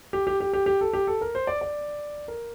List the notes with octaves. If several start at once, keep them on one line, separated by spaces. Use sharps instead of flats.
G4
G4
G4
G4
G4
A4
G4
A4
A#4
C5
D5
D5
A#4